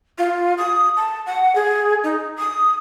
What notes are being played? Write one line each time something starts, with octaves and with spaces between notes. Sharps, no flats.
F4
D#6
A5
F#5
G#4
D#4
D#6